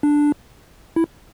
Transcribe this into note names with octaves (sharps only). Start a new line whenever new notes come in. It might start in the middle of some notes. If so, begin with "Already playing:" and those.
D4
E4